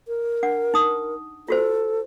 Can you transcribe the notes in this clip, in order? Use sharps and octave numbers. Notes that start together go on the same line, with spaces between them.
A#4
D4 F#5
D#4 D#6
F4 F#4 A4 C5